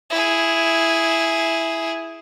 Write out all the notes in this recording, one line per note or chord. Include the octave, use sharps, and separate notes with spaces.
E4 G#4